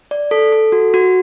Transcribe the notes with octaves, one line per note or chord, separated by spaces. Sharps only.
D5
A4
A4
F#4
F#4